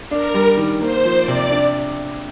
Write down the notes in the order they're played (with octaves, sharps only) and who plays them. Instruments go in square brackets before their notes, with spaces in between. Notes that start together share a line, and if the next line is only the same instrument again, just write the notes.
[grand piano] D4 [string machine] A#4
[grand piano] G3
D#3
[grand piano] A#3 [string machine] C5
[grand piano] F3
[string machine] D5
[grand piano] C3
D4